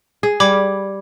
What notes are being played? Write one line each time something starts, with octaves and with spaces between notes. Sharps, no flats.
G#4
G3 B5 D6 G#6